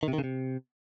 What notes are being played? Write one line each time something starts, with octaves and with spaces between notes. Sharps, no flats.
D#3
C3
D#3
C#3
C3